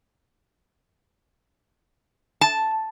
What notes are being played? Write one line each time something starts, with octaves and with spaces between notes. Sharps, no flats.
A5